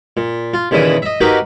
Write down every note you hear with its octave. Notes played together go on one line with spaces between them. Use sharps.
A#2
F4
D#2 A#2 C#3 E3 E4 D#6
D#5 E5
A#3 D#4 F#4 G4 A#4 B4